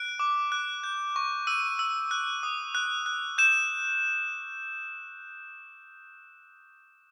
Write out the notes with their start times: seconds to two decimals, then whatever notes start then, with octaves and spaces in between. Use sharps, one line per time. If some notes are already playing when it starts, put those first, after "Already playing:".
Already playing: F#6 D7
0.20 D6
0.52 F#6
0.84 G6
1.16 C#6
1.47 E6 D#7
1.79 E6
2.11 F#6
2.43 D#6
2.75 F#6
3.06 F#6
3.38 G6 E7